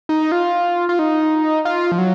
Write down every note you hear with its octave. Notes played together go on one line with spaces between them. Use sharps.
D#4
F4
F4
D#4
F4
F3
F#3